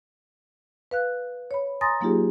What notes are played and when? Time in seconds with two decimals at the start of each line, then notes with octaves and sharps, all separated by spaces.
0.91 B4 F5 F#6
1.51 C#5 B5
1.81 G#5 A#5 C6 D#6 A6 A#6
2.01 F#3 A#3 D#4 F4 G4 G#4